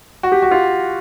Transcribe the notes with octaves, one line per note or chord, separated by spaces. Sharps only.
F#4
G4
F#4
F4